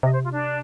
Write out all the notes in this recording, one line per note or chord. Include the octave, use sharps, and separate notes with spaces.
C3 D#5
C5
F4
D4